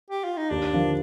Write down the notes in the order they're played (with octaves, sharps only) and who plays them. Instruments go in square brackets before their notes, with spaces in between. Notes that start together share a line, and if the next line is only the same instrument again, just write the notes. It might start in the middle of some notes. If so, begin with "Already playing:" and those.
[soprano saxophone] G4
F4
D#4
[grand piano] D#2 [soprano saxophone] D4
[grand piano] D3 F3 A#3